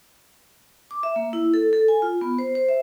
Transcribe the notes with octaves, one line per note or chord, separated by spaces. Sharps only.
D6
E5
A#3
E4
A4
A4
G#5
F4
B3
C5
C5
E5